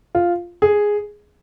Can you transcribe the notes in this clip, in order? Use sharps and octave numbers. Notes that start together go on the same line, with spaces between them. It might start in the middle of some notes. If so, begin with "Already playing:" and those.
F4
G#4